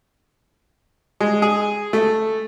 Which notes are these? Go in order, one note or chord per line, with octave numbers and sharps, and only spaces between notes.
G#3
G#4
A3